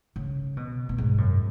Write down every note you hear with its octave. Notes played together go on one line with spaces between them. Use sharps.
C#3
B2
B2
G#2
F#2